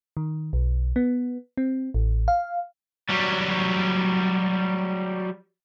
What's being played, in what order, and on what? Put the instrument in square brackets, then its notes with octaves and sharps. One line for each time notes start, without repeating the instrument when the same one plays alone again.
[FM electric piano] D#3
B1
B3
C4
A1
F5
[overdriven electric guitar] F#3 G3